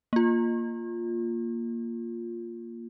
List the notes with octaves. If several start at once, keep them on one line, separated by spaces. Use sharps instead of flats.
A#3 F4